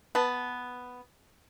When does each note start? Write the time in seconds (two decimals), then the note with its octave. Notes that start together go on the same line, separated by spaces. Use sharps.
0.15 B3 A5